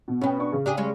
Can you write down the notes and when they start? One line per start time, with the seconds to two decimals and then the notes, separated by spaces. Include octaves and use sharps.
0.08 B2
0.21 B2 B3 C#4 G5
0.39 D4 C#6
0.52 C#3
0.66 D4 G4 G#4
0.77 G3 G#3 C#4